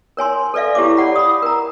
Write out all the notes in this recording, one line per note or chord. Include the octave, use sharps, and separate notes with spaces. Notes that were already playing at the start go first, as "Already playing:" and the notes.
A#4 C#5 G#5 C6
A4 B4 D5 E5 F5
E4 G4 A4 C#5 F5 D6
C#5 D5 F#5 B5
B5 D#6
A#4 A#5